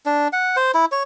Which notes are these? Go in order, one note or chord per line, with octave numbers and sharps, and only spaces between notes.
D4
F#5
C5
E4
C#5